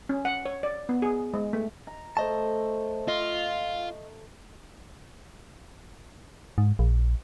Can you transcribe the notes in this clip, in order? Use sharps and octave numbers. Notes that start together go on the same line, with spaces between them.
C#4
F#5
C#5
D5
B3
G#4
G#3
A3
A#5
A3 C5 D#5 A5
F4 D#5
G#2
A#1